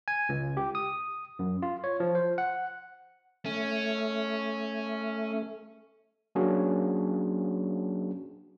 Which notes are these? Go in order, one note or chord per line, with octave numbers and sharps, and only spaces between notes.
G#5
C#2
G4
D#6
F#2
F4
C#5
F3
C5
F#5
A3 C#4
F#3 A#3 C#4 D4 F#4 G#4